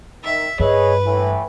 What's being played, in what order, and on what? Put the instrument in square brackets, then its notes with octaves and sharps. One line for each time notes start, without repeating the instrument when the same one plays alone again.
[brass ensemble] D#3 [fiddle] E5
[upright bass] G2 [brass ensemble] G#4 C#5 D#5 [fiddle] B4
[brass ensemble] A2 E3